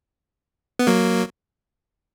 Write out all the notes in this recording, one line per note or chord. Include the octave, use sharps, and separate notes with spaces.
B3
F#3 A#3